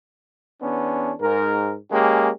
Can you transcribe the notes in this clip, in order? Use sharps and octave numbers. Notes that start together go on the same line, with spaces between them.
E2 B3 C#4 D4
G#2 A#4
G#3 A#3 C#4 G4